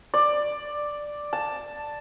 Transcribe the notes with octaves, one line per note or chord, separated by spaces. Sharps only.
D5
A5